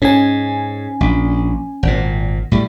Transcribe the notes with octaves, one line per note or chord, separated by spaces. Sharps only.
G#2 C#4 G#5
A#1
G#1 A#2
A2 G3